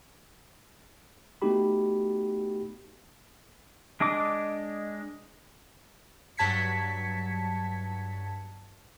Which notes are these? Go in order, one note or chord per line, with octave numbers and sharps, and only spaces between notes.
A3 B3 D#4 F#4 G4 B5
G#3 D4 D#5 D6
G2 F#3 A5 G#6 B6 C#7